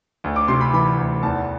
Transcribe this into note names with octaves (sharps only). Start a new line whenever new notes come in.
D2
D6
C3 C6
B5
E3 B5
D2
E2 A5